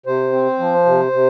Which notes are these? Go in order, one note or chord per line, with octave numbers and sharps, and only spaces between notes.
C3 C5
C4
F3
C3
C3